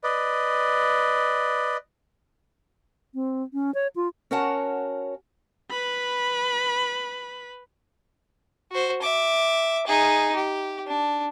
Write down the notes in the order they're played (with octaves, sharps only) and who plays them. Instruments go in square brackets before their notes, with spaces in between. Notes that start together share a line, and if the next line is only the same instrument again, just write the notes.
[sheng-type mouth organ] B4 D5 D#5
[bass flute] C4
C#4
C#5
F4
[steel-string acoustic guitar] C#4 F#4 A#4 C#5 F#5 A5
[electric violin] B4 B5
[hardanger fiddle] F#4 C5
E5 D6
D#4 G#4
G4
D4